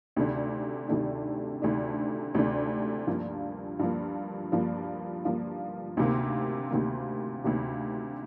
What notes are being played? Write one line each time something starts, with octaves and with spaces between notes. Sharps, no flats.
D2 C3 D#3 A3 D4
D2 C3 D#3 A3 D4
D2 C3 D#3 A3 D4
D2 C3 D#3 A3 D4
G2 F3 A#3
G2 F3 A#3
G2 F3 A#3
G2 F3 A#3
D2 C3 D#3 A#3
D2 C3 D#3 A#3
D2 C3 D#3 A#3